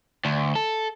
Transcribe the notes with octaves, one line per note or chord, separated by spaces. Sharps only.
D2
A4